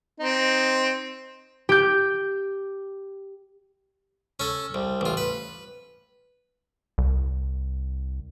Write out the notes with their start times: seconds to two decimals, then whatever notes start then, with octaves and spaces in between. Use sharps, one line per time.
0.20 C4 D#4
1.69 G4 G6
4.40 C#4 A4
4.74 C2
5.01 A1 F4
5.17 B4
6.98 C2